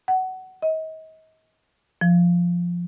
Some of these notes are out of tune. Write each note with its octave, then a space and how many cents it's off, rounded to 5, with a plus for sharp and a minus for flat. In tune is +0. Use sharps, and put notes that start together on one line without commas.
F#5 +20
D#5 +35
F3 +0